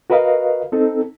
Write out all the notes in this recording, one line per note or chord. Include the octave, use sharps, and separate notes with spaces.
F#4 A#4 B4 D#5 F5
C4 D#4 A4